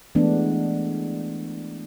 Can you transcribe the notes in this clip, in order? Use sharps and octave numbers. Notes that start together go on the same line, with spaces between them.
E3 G#3 A3 B3 D4